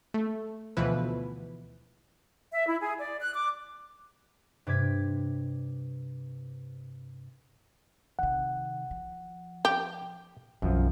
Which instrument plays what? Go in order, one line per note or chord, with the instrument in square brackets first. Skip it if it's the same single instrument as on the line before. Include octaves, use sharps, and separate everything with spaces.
[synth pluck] A3
D2 B2 E3 F3 E4 B4
[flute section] E5
E4
G#4
D5
F#6
D6
[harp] G2 C3 D6 G#6 B6
[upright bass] C3 D#3 [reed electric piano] F#5
[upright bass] F3
[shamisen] G4 [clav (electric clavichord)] G5
[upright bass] B1 E3 [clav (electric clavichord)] F#2 F3